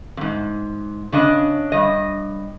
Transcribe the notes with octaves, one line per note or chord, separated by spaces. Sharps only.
F2 G#2
C#3 D4 D#5
G2 D#5